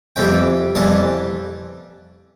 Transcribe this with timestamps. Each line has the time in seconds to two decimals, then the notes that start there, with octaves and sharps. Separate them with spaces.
0.16 F2 E3 G3 G5
0.75 F2 E3 G3 A5